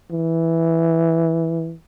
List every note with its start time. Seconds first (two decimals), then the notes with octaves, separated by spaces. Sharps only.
0.11 E3